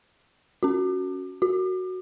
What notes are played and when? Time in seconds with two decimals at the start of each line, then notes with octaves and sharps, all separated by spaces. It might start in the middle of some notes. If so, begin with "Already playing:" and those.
0.63 C#4 F#4
1.42 F#4